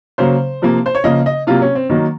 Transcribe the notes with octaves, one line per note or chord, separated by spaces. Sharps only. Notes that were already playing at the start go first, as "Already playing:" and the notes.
C#3 F#3 A#3 C5
C3 F3 A#3
C5
C#5
C#3 F3 A#3 D#5
D#5
C3 F#3 A#3 F4
C#4
C4
D#3 F#3 A#3 D#4